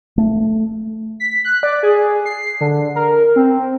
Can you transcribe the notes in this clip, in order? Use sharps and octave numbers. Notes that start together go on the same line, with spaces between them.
A3
B6
F#6
D5
G#4
C7
D3
A#4
C4